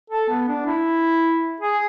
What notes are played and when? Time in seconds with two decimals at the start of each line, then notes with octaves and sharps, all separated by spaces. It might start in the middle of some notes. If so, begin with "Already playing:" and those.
0.10 A4
0.29 B3
0.48 D4
0.66 E4
1.60 G#4